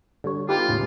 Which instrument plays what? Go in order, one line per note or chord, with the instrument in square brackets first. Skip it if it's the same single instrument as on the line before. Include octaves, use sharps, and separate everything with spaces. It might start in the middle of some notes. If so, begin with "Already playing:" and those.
[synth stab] D3 G3 C#5
[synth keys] B3 D#4 A4 [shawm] F4 [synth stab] G4 B4 G5
[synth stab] D#2 [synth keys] A2 C#3 G#3